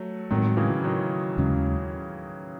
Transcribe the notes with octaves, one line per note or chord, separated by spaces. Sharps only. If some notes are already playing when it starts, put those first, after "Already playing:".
Already playing: F#3 A3
A2 D#3 F#3 G#3 C4
C#3 E3
D#3 F#3
D#2 C#3 G#3 C#4